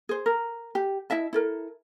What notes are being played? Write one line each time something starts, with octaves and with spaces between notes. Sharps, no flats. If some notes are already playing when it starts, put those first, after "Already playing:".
G#4 C5
A#4
G4
E4 D#5 E5 A5
E4 A4 A#4